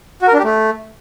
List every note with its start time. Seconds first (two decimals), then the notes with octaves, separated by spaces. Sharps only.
0.22 F#4
0.28 A#4
0.33 D4
0.39 G4
0.44 A3